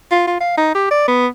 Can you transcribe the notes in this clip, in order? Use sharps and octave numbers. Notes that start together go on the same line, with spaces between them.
F4
F4
F5
D#4
G4
D5
B3